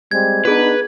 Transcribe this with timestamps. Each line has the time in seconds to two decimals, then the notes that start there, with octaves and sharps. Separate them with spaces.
0.11 G3 G#3 C4 G#6
0.45 B3 D4 D#4 F4 G#4 B4